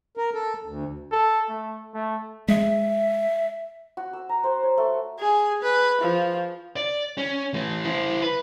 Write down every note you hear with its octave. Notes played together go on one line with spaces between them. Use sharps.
A#4
A4
D2
A4
A3
A3
G#3 E5
F#4
E6
A#5
C5
C#5
A3
G#4
B4
F3
D5
C#4
E3 A3
E4 C5
B4